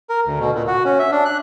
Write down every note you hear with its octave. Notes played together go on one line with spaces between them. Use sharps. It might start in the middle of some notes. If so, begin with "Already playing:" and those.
A#4
D2
B2
A#2
F#4
C#4
E5
D4
F#6